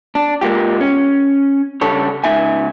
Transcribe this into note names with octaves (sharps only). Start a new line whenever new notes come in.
D4
G#3 A#3 F4 G4
C#4
C#3 G3 D4 A4 C#5
C#2 A#2 D#4 E5 G#5